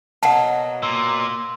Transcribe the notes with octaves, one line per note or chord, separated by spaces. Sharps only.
B2 F#3 A#3 F#5 A5
A#2 C6 E6